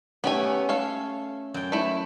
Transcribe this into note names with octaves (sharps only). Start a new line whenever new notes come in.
A3 B3 C#4 G4 G#5
A4 C#5 F5
F#2 G5
A3 E4